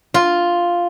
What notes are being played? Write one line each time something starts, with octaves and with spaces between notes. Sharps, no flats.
F4